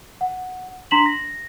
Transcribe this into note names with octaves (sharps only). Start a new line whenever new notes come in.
F#5
D4 A#5 C6 B6 E7 F#7
A#6